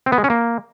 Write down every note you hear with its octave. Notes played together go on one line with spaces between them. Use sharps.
C4
B3
G#3
C#4
A#3